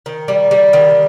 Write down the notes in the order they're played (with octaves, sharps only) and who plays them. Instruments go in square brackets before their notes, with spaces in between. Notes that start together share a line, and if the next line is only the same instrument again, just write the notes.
[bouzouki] D#3
G3
G3
D#3